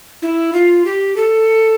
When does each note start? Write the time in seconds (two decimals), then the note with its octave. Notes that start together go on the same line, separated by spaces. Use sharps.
0.22 E4
0.53 F4
0.85 G4
1.16 A4